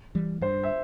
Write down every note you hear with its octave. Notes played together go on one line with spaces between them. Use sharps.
E3 G3
G2 C5
E5